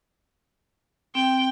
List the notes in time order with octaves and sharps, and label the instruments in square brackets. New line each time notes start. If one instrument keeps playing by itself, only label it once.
[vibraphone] C4 [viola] G5